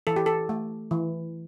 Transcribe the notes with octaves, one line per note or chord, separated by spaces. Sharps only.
E3 A4
G4
A4
A3
E3